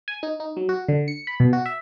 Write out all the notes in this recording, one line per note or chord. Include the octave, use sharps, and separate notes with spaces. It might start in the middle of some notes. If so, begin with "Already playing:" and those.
G#5
D#4
D#4
F#3
F#4
D3
C#7
B5
B2
F#4
E5